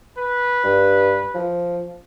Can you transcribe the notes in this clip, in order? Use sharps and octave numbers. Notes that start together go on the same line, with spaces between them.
B4
G2
F3